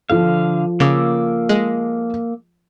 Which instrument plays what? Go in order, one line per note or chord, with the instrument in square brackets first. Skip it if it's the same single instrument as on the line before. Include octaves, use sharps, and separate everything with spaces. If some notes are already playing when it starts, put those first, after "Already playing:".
[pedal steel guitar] D3 F5 [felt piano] F3 F4 A4
[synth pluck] C#3 [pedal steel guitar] A#3 D6 E6
[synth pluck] G#3